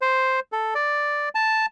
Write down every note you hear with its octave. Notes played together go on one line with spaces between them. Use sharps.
C5
A4
D5
A5